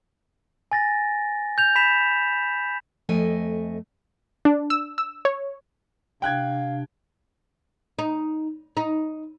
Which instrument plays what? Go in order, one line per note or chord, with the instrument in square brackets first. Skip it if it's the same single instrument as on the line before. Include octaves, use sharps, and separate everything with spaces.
[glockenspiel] G#5 A6 A#6
G6 F7
B5 B6 E7 F7
[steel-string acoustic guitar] F2 A3 D#5 G#5
[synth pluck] D4
E6
E6
C#5
[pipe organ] C3 D4 [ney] F5 [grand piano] G5 F#6 G#6
[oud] D#4
D#4